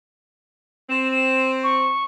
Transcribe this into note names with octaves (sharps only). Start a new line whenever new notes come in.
C4 E7
E7
C#6